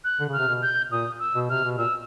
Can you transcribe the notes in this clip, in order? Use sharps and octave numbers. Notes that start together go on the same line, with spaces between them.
F#6
D3
C#3 F6
C3
B2
G6
A#2 D#6
E6
B2
C3 F6
B2
A#2 E6